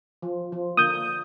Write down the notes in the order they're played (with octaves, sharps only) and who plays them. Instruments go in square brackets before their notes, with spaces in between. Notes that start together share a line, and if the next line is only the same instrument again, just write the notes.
[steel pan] F3
F3
[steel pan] D3 A#3 [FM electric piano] D#6 G6